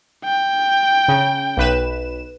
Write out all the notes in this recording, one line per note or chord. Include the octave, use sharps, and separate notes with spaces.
G5
C#3
B1 B4 E7